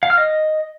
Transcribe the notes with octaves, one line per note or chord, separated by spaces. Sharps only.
F5
F6
D#5